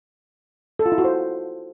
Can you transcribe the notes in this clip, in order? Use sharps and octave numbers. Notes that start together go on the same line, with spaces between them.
A4
F4
E4
F#4
C5